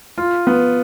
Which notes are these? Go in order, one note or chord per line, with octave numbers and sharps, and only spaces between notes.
F4
B3